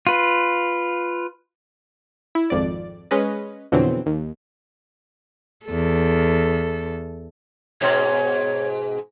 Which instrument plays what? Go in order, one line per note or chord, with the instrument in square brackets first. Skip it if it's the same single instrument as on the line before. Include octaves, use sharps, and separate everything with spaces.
[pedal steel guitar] F4 B4
[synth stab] E4
G#1 F2 D5
G#3 C#4 B4 D#5
F2 B2 D3 E3 F#3 C4
D#2
[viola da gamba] E2 A4
[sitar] G#2 B2 [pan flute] C#5